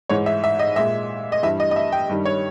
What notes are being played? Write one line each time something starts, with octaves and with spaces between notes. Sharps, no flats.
G#2 E3 G#3 C#5
E5
E5
D#5
A#2 G#3 E5
D#5
G2 E3 G3 E5
D#5
D#5
E5
G5
G2 D#3 G3
C#5